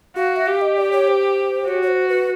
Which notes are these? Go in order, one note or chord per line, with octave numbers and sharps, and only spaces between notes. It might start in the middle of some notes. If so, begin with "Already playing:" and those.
F#4 F5
E5
G4 F5
D#5
D5
C#5
C5
F#4 C#5
C#5
C5
B4